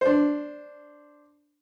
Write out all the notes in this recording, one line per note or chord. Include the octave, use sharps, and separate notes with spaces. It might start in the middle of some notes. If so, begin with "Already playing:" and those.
D4 C5